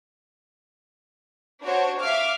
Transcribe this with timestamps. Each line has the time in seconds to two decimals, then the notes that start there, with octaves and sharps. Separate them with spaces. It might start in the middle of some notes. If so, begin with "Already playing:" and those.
1.63 D4 F#4 C5 C#5
2.02 E5 F5 D6 F6